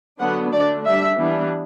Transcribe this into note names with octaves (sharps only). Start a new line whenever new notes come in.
D3 F#3 B3 D4 F#5
D3 A3 D4 D5
G3 D4 E5
E3 G3 B3 D4